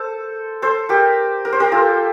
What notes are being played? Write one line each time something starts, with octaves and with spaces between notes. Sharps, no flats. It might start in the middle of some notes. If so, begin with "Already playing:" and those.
Already playing: A4 C5
A4 C5
G4 A#4
A#4
C5
G4 A#4
F4 A4